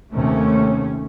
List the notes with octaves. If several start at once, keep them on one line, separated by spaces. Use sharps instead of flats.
D#2 C3 A3 C#4